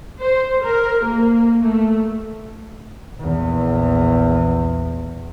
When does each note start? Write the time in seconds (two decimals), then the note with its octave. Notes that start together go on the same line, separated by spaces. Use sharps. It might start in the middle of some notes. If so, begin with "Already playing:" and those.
0.21 C5
0.63 A#4
1.05 A#3
1.62 A3
3.17 A#1 E2